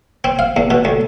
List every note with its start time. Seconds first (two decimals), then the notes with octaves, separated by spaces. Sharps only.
0.24 C4
0.39 F5
0.56 E2
0.71 B2
0.85 D2